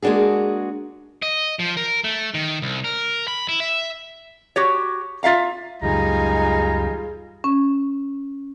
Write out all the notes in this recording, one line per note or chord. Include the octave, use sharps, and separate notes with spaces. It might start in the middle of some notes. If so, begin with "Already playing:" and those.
G#3 A#3 D4 F#4 G#4
D#5
F3
A#4
A3
D#3
C2
A#4
B5
E4
E5
F#4 G4 C#5
F4 E5 F5 A#5
C#2 F#2 G3 D#4 F4 G#4 G#5 A#5
C#4